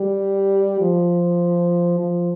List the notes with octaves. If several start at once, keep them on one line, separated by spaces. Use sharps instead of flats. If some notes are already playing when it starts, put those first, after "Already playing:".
Already playing: G3
F3
F3